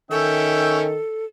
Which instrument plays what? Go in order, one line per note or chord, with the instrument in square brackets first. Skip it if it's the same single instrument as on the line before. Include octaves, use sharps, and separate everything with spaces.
[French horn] D#3 [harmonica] C#4 E5 G5 [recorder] A4